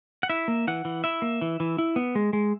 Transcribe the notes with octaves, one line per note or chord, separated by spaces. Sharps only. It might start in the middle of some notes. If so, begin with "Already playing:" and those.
F#5
E4 E5
A#3
E3 F#5
E3
E4 E5
A#3
E3
E3
E4
B3
G#3
G#3